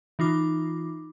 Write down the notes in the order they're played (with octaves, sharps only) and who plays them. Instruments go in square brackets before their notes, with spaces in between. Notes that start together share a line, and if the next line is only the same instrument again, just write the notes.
[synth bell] E3 D#4 F4 D6